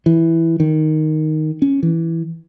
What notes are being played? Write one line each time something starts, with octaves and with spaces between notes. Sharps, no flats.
E3
D#3
C#4
E3